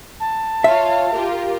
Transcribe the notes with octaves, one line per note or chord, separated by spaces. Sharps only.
A5
F4 C#5 E5 F5
F4 G4 A#4